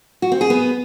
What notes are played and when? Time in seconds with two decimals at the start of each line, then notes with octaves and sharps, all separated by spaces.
0.22 F#4
0.32 C4
0.41 G#4
0.50 B3